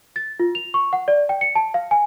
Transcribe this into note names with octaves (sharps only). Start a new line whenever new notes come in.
A6
F4
F7
C#6
F#5
D5
G5
C#7
A5
F5
G#5